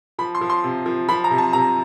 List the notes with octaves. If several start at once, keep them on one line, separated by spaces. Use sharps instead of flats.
F3 B5
C6
F3
C6
C3
F3
F3 B5
A#5
C3
A5
C3 A#5